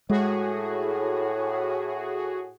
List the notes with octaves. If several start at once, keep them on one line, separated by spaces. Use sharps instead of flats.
A2 G#3 F#4 G#4